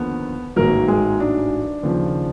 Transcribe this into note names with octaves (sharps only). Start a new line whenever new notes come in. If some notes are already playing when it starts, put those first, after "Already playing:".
Already playing: D#2 D3 F3 A#3 B3
A1 G#2 D#3 F#3 A#3 A#4
G#3 G#4
D4
D#2 C#3 F3